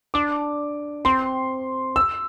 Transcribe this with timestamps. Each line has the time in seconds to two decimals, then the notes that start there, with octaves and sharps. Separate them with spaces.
0.14 D4 D6
1.05 C4 C6
1.96 E6